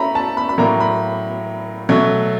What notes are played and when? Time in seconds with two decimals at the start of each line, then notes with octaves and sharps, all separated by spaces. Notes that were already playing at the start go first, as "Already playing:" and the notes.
Already playing: A3 C#4 E4 A#5 B5
0.15 A5
0.37 B5
0.49 B5
0.58 A2 F#3 A#3 A#5
0.80 B5
1.89 B2 F#3 A3